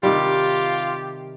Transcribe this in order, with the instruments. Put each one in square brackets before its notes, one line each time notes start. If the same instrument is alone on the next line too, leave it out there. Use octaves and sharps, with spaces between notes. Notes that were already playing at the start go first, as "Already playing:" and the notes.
[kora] C3 D#3 G3 [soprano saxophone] F4 [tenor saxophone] G4